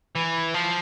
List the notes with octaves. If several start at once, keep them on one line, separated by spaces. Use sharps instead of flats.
E3
F3